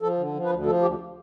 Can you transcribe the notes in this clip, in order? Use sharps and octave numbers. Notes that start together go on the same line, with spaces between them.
F3 A4
D3
F3
B4
D2
F3 A4
D2 G4